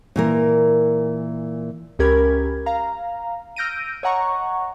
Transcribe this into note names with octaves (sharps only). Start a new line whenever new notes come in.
A#2 E3 A#4
C#2 C#4 G4 A#4 B5 G#6
F5 A#5
E6 F6 G6 A#6 D7 D#7
C#5 D#5 F#5 A#5 C#6